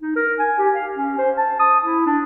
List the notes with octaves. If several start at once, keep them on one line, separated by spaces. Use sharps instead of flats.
D#4
A#4
G#5
G4
F5
C#4
C5
A5
D#6
E4
D4